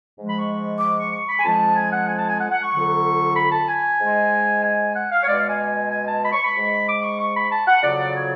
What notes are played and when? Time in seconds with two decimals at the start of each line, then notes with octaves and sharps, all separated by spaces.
0.16 G#2 F3 G#3
0.27 B5
0.37 C#6
0.80 D6
0.96 C#6
1.11 C#6
1.28 B5
1.37 G#5
1.44 F2 F3 G#3 A5
1.76 G#5
1.91 F#5
2.07 G#5
2.18 A5
2.29 G#5
2.39 F#5
2.49 F#5
2.61 C#6
2.71 F2 D3 F#3
3.35 B5
3.51 A5
3.67 G#5
3.99 G#2 G#3
4.63 G#5
4.95 F#5
5.10 F5
5.21 C#5
5.26 B2 G#3 D5
5.37 F5
5.47 G#5
5.90 G#5
6.06 A5
6.22 B5
6.32 C#6
6.42 B5
6.54 G#2 G#3
6.86 D6
7.02 C#6
7.18 C#6
7.34 B5
7.50 A5
7.66 F#5
7.82 F2 C#3 F#3 D5
8.14 C#5